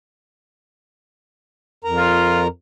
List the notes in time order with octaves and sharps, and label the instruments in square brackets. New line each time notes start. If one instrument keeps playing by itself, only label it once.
[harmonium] F2 A#4 A#5
[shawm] F4